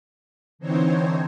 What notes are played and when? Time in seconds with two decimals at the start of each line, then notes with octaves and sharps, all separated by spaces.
0.59 D3 E3 C4 D#4 C5 C#5